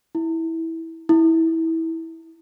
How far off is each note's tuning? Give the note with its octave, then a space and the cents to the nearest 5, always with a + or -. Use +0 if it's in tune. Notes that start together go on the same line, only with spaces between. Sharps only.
E4 -15
E4 -20